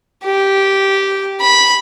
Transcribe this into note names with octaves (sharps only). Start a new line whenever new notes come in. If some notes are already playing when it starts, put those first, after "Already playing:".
G4
B5